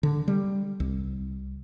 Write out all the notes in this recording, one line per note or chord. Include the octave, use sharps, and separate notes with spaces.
D3
G3
C2